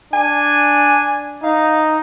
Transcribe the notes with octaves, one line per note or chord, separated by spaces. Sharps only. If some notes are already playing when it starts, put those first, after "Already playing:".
D4 G#5
D#4 F5